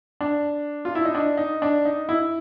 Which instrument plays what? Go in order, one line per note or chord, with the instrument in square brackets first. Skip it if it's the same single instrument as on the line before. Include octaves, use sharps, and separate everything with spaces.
[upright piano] D4
F4
E4
D#4
D4
D#4
D4
D#4
E4